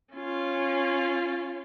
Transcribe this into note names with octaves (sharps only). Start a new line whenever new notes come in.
C#4 F4